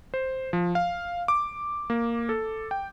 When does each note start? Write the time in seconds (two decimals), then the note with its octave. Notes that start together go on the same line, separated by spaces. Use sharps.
0.14 C5
0.53 F3
0.75 F5
1.28 D6
1.90 A#3
2.29 A4
2.71 G5